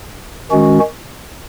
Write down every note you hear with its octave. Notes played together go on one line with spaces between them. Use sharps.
D#3 G#3 C#4 F#4